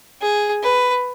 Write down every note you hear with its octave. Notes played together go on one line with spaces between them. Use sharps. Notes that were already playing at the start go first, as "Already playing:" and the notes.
G#4
B4